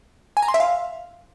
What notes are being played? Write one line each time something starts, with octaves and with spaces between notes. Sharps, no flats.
G#5
A#5
C6
E5
F5